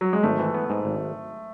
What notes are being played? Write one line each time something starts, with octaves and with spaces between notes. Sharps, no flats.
F#3
G#3
G#1 A3
E3
B3
G#2
G#1